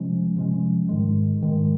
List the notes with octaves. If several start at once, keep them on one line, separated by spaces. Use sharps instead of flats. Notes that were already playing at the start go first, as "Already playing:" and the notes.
Already playing: C3 F3 G#3 C#4
C3 F3 G#3 C#4
G#2 D#3 G#3
G#2 D#3 G#3